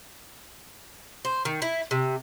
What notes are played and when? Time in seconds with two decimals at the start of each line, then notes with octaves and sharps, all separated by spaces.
1.25 C5
1.45 D#3
1.62 E4
1.91 C3